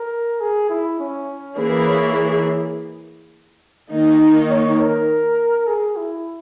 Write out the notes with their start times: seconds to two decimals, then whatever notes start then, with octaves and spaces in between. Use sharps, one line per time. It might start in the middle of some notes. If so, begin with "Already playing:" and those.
Already playing: A#4
0.40 G#4
0.69 E4
0.99 C#4
1.57 E3 A#3 E4 G#4 B4
1.86 C#5
2.16 C#5
3.91 D#3 A#3 D#4
4.50 C#5
4.79 A#4
5.67 G#4
5.96 E4